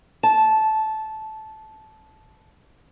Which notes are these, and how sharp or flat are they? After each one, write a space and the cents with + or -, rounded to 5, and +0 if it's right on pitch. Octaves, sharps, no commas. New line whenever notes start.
A5 -15